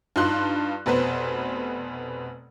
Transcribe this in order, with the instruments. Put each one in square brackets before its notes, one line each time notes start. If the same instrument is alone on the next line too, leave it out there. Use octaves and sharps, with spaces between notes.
[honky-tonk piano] G2 D#4 F4 C6 F#6
F1 B2 B4 C5